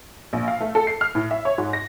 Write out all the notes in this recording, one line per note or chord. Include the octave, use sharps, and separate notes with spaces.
A#1
F5
A3
A4
C7
F6
A2
E5
C#5
G#2
A#6